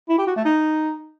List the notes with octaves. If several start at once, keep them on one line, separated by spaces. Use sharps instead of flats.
E4
G4
F#4
A3
D#4